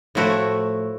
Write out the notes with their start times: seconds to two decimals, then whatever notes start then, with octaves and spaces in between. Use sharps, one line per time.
0.15 A2 F3 A3 E4 F#4